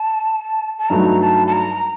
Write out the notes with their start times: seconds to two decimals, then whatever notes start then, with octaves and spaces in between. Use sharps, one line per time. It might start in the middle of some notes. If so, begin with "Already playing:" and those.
Already playing: A5
0.79 A5
0.89 G2 F#3 A3 D#4 A#5
1.21 A5
1.47 A5
1.53 A#5